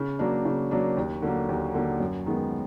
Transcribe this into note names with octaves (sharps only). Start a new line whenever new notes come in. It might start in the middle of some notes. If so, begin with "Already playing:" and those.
Already playing: C#3
F#3 A#3 D4
C#3
F#3 A#3 D4
D#2
D3 F#3 A#3
D#2
D3 F#3 A#3
F#2
D#3 G#3 B3